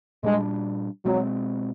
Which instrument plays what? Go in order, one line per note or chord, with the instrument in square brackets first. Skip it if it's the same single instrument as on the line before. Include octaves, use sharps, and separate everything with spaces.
[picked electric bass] A#2 G3 B3 D4 [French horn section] G#3
[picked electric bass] B2 G#3 C4 [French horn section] F#3